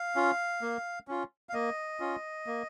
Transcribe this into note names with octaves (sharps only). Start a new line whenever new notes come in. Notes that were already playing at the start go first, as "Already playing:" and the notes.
Already playing: F5
C#4 F4
A#3
C#4 F4
F5
A#3 D#5
C#4 F4
A#3